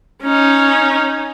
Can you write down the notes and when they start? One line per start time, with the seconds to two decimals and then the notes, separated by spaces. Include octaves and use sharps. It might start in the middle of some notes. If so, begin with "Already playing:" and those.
0.22 C#4 D#4